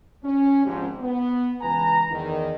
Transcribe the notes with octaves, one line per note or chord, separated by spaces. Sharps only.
C#4
G#1 G#2 F3 G4
B3
C#2 E3 B4 G#5 A#5
E2 D#3